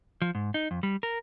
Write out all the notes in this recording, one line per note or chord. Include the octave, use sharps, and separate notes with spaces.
F3
G#2
D#4
F2
G3
A#4